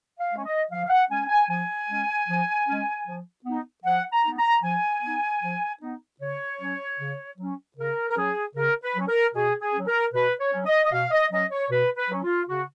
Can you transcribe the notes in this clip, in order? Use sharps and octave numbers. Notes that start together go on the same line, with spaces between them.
F5
G#3 C#4
D#5
F3 F5
F5
F#5
G#3 C#4 G#5
G#5
F3 G#5
G#3 C#4
F3
G#3 C#4
F3
B3 D#4
F3 F#5
A#5
B3 D#4
A#5
F3 G#5
B3 D#4
F3
B3 D#4
C#3 C#5
F#3 C#4
C#3
F#3 C#4
C#3 A#4
A#4
F#3 C#4 G#4
C#3 A#4
B4
F#3 C#4
A#4
B2 G#4
G#4
F#3 C#4
A#4
B2 B4
C#5
F#3 C#4
D#5
D#5
B2 F5
D#5
F#3 C#4 D#5
C#5
B2 B4
B4
F#3 C#4
F4
C#3 F#4